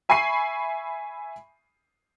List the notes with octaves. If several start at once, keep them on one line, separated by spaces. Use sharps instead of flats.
E5 G#5 B5 C#6 C7 D#7